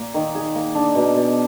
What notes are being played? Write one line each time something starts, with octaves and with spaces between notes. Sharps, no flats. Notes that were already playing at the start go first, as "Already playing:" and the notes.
Already playing: A#2 A#3
D#3
G#4
A#3
D4
B2
B2